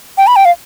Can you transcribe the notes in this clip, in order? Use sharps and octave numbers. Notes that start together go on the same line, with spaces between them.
G5
B5
G5
F5